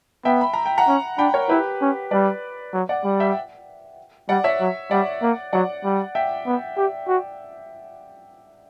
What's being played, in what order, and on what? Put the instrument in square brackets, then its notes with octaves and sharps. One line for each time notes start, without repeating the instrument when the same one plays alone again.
[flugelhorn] B3 [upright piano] E5 G5
[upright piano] B5
A#5
G5
F#5 A#5
[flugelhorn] C#4
[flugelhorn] D4 [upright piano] G5 B5
[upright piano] A#4 C#5
[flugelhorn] E4 [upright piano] G4 B4
[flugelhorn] C#4
[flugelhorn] G3 [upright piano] B4 D5
[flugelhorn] F#3
[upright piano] D5 F#5
[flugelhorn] G3
[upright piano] E5 G5
[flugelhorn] G3 [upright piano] D5 F#5
[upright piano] C#5 E5
[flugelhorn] F#3
[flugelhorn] G3 [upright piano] D5 F#5
[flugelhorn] A#3
[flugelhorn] F#3 [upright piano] D5 F#5
[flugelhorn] G3
[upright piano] E5 G5
[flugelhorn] B3
G4
F#4